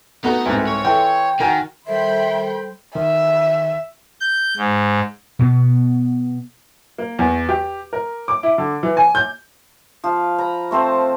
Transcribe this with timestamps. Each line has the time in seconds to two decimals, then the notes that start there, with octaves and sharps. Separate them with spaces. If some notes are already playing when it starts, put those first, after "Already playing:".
0.24 A3 B3 D#4 F#4 B4 A#5
0.46 C2 G#2
0.67 C#5
0.85 E3 A4 G5 C6
1.40 D#3 F#4 A#4 F#5 G#5 A#5
1.87 D#3 G3 A4 C5 E5 G5 B5 C6
2.95 D#3 E5
4.20 G6
4.57 G#2
5.39 B2 B3
6.98 A#3
7.19 E2
7.49 G4
7.93 A#4
8.28 D6
8.43 E4
8.58 D3
8.83 E3
8.97 G#5
9.15 G6
10.04 F3 F5
10.38 A#5 B5
10.71 A3 C4 C5 A5